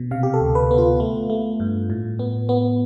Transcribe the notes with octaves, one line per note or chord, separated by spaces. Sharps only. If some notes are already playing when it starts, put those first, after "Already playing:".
Already playing: B2
C3 F5
G4
A4
D2
B4
B3
F4
A3
A3
G2
A2
B3
B3